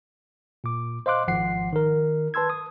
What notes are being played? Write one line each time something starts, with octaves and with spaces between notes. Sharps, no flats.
A#2 D6
C5 D#5 F5 C6 D6 F#6
G#1 F3 F#5 C7
D#3 A#4
B4 A5 C6 E6 G#6
D#6